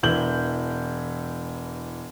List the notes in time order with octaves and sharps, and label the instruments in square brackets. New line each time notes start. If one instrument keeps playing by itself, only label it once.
[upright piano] E1 E3 G6 F#7